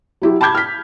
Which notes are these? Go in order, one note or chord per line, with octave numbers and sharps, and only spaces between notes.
F#3 E4 G4
A5 B5 D6 G6 G#6
F6 B6